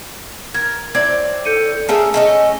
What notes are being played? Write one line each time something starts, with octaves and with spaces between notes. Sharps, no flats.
A#4 G#6
A2 C4 D5 G#6
A4 G6 C#7 D#7
A3 C#4 G#4 A#4 A5
A3 C#4 D#4 D#5